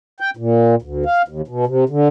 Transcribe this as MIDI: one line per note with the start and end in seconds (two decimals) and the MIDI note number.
0.20 0.30 79
0.37 0.75 46
0.82 1.05 38
1.06 1.22 77
1.28 1.42 39
1.48 1.65 47
1.67 1.84 48
1.89 2.08 50